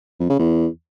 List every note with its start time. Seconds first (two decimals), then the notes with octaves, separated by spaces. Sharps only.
0.20 F2
0.29 C#3
0.39 E2